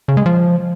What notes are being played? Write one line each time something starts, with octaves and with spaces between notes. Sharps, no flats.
C#3
G#3
F3